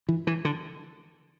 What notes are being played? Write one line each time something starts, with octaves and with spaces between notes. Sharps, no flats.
E3
E3
D3